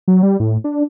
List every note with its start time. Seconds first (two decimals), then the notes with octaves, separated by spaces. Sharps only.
0.08 F#3
0.23 G3
0.40 A2
0.64 D4